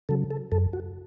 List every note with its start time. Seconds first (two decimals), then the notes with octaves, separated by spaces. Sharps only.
0.09 C#3 F#3 A4
0.31 A4
0.52 F#2 A4
0.73 F#4